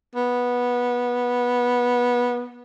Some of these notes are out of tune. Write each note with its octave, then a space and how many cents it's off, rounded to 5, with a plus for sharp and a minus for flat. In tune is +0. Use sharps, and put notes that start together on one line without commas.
B3 -15